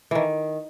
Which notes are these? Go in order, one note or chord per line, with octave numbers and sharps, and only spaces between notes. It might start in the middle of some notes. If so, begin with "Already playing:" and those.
D#3 E3